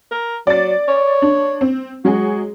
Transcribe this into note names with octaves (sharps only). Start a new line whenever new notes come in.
A#4
F#3 D5 A6
C#5
D4
C4
F#3 G#3 F#4 G#4